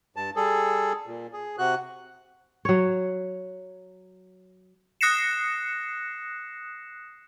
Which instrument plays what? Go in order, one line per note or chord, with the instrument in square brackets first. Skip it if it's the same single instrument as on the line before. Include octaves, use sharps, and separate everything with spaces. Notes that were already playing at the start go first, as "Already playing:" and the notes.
[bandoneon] G2 A5
G3 G#4 A4
A#2
G#4
C3 F#4 F#6
[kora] F#3 C#5
[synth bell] D#6 F#6 A#6 C7 C#7 E7